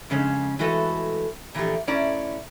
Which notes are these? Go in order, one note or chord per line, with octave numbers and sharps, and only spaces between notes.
F2 C#3 G#3 C#4
E3 G#3 A3 F#4 A4 B4
A#2 E3 F3 A3 G4
A2 C#4 E4 D5 A#5